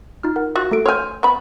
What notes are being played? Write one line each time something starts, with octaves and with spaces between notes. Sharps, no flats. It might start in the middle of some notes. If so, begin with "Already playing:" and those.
D#4 F4 F6
A#4 F#5
F4 F#4
A3 A4 D7
C#5 G#5 C6 F6 G6
B3 B5